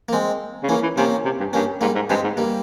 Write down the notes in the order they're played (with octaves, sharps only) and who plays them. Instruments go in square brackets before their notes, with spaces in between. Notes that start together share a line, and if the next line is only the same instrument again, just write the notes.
[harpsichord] A#3
G#3 C4
[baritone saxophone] C#3
[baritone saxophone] E3 [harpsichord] A#3 C#4
[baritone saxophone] E3
[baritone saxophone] C3 [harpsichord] A#3 C#4
[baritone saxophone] C3
G2
[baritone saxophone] G2 [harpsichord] A#3 C#4
[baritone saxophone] G#2 [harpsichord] G3 A#3
[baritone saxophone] G#2
[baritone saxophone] G2 [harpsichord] G#3 C4
[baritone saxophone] G#2
[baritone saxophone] G2 [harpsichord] G3 A#3